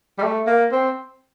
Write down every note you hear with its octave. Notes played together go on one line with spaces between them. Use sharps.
G3
A3
A#3
C4